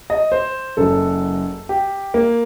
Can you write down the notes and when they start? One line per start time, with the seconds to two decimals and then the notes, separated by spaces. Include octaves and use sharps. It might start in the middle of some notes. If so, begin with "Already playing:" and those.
0.10 D#5
0.32 C5
0.77 F#1 F#2 F#3 A4
1.69 G4
2.14 A#3